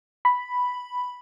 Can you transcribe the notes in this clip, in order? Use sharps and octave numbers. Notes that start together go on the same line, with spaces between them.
B5